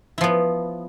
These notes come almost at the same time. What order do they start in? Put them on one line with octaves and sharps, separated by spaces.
E4 F3 B3